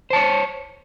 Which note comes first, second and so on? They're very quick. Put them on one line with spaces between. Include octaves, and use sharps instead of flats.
C5 A5 C#5